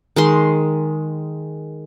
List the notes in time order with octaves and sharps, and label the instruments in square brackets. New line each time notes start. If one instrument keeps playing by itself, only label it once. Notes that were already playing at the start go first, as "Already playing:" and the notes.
[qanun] D#3 G#3 C6